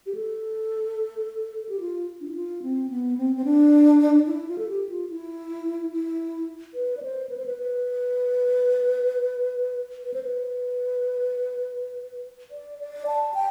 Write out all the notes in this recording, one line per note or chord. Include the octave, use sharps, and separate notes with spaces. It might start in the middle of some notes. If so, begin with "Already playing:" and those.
G4
A4
G4
F4
D4
E4
F4
C4
B3
C4
C4
D4
E4
F4
A4
G4
F4
E4
E4
B4
D5
C5
B4
C5
B4
B4
B4
C5
B4
D5
D5
A5
G5